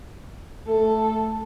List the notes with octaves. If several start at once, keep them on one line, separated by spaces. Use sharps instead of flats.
A3 A4